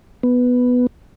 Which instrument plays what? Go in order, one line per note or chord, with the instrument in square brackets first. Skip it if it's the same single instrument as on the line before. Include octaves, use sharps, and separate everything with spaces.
[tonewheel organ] B3